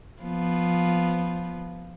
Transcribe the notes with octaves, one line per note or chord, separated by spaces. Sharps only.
F3 B3